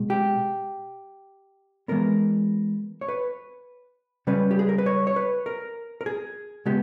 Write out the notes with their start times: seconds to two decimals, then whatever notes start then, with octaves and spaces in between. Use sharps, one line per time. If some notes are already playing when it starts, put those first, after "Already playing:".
Already playing: B2 G#3
0.10 G4
1.88 E3 G#3 B3 A#4
3.01 C#5
3.09 B4
4.27 C#3 G3 C#4 B4
4.51 G4
4.59 G#4
4.69 A#4
4.78 B4
4.86 C#5
5.07 C#5
5.16 B4
5.46 A#4
6.01 A#4
6.06 G#4
6.66 C#3 G#3 B3 G4